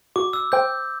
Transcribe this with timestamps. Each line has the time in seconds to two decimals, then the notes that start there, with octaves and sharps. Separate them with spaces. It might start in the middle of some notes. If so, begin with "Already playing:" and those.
0.16 F#4 D6
0.33 E6
0.52 C5 G5 G6